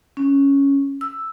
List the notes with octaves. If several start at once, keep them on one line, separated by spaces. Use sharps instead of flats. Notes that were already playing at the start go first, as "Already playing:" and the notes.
C#4
E6